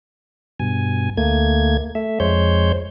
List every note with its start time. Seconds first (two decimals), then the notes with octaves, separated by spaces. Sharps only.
0.60 G2 B2 G#5
1.17 D2 A3 A#3 G#6
1.95 A3 E5
2.20 F2 G#3 C5 C#5 G6